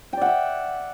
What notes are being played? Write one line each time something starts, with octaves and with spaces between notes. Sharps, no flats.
D5 E5 F#5 G5